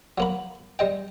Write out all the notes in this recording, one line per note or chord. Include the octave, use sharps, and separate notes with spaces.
F#3 A#3 B5
G3 D#5 G5